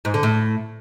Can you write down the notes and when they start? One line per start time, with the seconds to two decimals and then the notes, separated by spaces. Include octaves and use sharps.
0.05 G#2
0.14 D3
0.23 A2